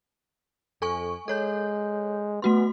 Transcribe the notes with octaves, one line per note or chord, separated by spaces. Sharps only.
F2 A4 G#5 C#6
G#3 A4 C#5 G6
A3 B3 F#4 C6